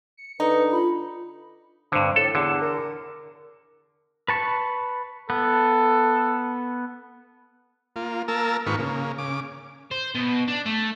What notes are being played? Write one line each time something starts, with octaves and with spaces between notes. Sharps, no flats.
C#7
D3 D#4 B4
F4 B5
G2 D3 C4
A2 A4
E2 D3
A#4
B4 A5 C#6
B3 A4
A#3 F4
A#3 A#4 A5 E6
G#2 D#3 A#3 F4 B4 C#6
C#3 A#3
C#3 D6
C5
B2
D4
A3